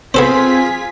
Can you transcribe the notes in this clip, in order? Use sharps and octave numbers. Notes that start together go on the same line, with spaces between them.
B3 C4 F4 G#4 A4 C5 B6